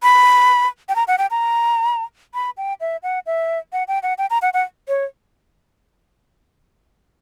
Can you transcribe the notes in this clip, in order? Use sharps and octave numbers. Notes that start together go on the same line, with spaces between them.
B5
G5
A#5
F#5
G5
A#5
B5
G5
E5
F#5
E5
F#5
G5
F#5
G5
A#5
F#5
F#5
C#5